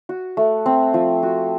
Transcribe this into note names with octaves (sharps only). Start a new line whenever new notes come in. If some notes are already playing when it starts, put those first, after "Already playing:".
F#4
A3
C4
F3
F#4